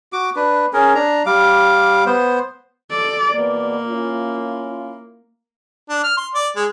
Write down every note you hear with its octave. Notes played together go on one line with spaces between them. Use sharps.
F#4 D6
D4 B4
C#4 G#4 A#4
D4 A#5
G3 F5 D6
B3 C5
A4 D5
E2 B2 A#3 D5
C#4 E4 F4
D4
F6
C6
D5
G#3